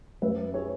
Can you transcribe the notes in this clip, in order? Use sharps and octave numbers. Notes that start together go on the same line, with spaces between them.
F#2 B4 E5
G#4 C#5